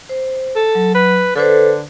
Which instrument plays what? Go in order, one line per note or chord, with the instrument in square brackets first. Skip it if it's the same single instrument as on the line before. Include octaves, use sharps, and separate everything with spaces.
[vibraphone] C5
[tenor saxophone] A4
[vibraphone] F#3
[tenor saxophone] B4
[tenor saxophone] D3 [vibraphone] A4 B4 C5